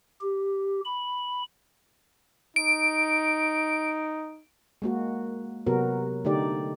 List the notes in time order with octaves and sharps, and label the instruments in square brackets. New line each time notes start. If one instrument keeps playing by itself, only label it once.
[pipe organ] G4
B5
[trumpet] D#4 [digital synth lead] D7
[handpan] G#3 A#3 F#4
C3 F#3 B3 F#4 A#4
D3 A3 D#4 G4 D5